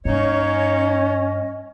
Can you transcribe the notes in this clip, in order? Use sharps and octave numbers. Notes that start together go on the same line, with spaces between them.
G2 A#3 C#4 D#4 C#5 D#5